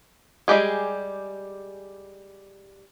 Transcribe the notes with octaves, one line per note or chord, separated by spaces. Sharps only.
G3 G#3 G4 G#4